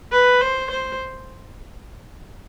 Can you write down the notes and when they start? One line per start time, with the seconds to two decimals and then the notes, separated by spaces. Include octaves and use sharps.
0.12 B4
0.41 C5
0.70 C5